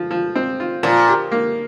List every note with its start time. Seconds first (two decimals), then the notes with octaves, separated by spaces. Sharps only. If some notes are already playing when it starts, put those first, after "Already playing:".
Already playing: F3
0.11 F3
0.35 C4
0.60 F4
0.83 A#2 F3
1.08 G4
1.32 A#3